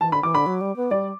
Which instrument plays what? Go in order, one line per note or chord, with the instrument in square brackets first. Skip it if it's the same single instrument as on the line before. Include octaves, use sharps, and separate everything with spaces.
[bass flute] E3 [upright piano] A5
[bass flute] D3 [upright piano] B5
[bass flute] E3 [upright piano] D6
[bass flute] D3 [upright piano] B5
[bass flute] F#3
G3
B3
[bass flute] G3 [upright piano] D5